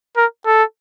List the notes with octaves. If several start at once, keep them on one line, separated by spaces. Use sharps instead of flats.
A#4
A4